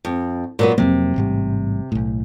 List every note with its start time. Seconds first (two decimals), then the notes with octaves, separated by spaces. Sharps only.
0.05 F2
0.59 A#2 F#3 B3
0.78 F2 C3 F#3 A#3
1.16 A1 G#2 G3
1.92 B1 A2